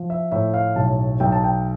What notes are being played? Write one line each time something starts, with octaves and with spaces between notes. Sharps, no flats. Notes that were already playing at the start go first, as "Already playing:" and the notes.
Already playing: F3
E5
A2 E5
F5
B1 A5
B1 G5
A5
G5